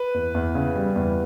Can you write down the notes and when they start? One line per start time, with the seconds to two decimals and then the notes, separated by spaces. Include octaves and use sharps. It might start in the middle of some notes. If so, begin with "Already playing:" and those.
Already playing: B4
0.14 E2
0.35 E2
0.55 C#3
0.76 G3
0.96 E2